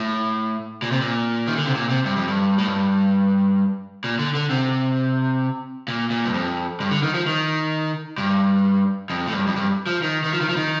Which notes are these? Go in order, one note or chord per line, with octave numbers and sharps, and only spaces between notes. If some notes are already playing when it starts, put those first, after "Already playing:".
Already playing: A2
A#2
C3
A#2
D#3
D3
C3
A#2
C3
G2
F2
G2
A2
G2
A#2
D3
D3
C3
A#2
A#2
G2
F2
G2
D3
D#3
F3
D#3
G2
F2
A2
G2
F2
G2
F3
D#3
D#3
F3
D#3
F3
D#3